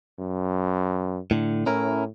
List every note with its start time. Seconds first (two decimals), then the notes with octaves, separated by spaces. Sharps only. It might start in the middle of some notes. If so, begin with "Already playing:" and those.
0.19 F#2
1.31 A2 D3
1.66 A2 C#4 E4 A#4